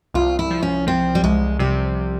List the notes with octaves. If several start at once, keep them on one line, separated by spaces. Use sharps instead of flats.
C2 F4
E4
F3
C#4
F3 C4
G3
C2 G#3
C3 G3